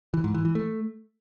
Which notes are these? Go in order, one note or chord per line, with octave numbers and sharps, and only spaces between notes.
E3
G#2
E3
E3
A3